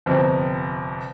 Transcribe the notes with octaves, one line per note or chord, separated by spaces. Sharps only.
G1 F2 C3